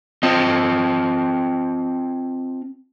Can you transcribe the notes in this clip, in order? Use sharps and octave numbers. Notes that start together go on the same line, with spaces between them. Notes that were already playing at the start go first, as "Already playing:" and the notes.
C4 F4 D#5